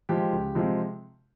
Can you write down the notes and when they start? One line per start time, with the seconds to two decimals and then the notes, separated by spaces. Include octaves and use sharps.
0.09 F3 G#3 G4
0.32 C#2
0.55 C3 F3 G#3